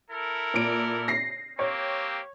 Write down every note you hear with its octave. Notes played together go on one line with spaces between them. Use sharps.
E4 A4 A#4
A#2 D7
A#6 C7
A#3 C4 G4 C#5